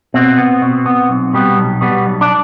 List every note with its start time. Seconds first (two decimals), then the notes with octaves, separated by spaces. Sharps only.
0.14 B2 C4
0.38 B3
0.62 B2
0.86 B3
1.09 B1
1.34 B2 G3 B3
1.57 B1
1.81 B2 G3 B3
2.05 B1
2.21 D4